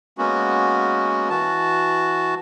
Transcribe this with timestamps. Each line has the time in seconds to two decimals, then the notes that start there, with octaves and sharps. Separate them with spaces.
0.18 G#3 A#3 B3 C#4 F#4
1.30 E3 F#4 A5